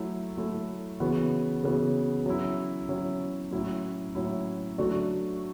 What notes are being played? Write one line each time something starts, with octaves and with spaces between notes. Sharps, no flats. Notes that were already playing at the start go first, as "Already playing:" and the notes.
Already playing: F#3 A3 E4
F#3 A3 E4
C#3 E3 B3 F#4
C#3 E3 B3 F#4
F#3 C#4 E4
F#3 C#4 E4
A2 F#3 C#4 E4
A2 F#3 C#4 E4
F#3 A3 D4 F#4